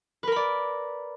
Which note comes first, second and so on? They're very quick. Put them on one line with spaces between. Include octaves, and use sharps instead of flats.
B4 A#4 B5 D5